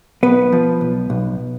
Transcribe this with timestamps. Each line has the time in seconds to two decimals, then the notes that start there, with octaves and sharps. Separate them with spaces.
0.23 B1 B3 B4
0.52 F3
0.81 B1
1.10 B1